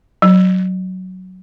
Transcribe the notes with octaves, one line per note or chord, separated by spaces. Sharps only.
F#3